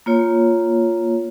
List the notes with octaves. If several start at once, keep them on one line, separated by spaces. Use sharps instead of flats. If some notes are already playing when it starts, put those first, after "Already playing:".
A#3 F4 C#5